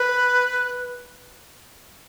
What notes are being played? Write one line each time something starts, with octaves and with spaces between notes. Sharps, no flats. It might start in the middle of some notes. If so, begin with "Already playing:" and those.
Already playing: B4